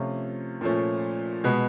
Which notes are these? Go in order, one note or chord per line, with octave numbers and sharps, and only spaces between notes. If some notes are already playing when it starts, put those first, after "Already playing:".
Already playing: C3 F3 A3 C#4 F4
A#2 F3 A3 C#4
B2 G#3 B3